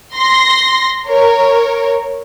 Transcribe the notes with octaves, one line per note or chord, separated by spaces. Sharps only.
C6 A#6
A#4 C#5